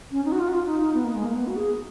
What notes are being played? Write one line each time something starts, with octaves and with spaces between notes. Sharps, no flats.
C#4
D#4
F#4
F4
F#4
F4
D#4
D#4
B3
A#3
G#3
A#3
B3
F#4
G#4